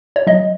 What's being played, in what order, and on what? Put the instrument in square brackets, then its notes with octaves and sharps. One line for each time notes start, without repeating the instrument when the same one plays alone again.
[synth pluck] C#5
F#3 D#5